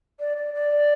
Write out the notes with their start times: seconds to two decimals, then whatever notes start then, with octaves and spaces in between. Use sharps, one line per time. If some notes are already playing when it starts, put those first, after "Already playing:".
0.20 D5
0.37 D5
0.54 D5